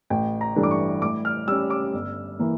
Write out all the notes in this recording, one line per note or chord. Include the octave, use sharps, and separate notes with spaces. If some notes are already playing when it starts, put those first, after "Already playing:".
A1 G5
A#5
G2 E3 A3 D4
D6
C#6
A2 D6
F6
G3 C#4 E6
D6
G1
E3 A#3